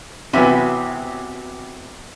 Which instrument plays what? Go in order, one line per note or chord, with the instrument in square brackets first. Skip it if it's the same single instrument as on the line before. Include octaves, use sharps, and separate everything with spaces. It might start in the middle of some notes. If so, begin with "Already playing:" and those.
[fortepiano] C3 E3 F#3 [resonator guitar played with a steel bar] B3 C#5 E5